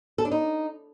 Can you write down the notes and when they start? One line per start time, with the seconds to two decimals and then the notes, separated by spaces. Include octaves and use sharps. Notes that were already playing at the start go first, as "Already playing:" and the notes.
0.18 A4
0.25 D4
0.31 D#4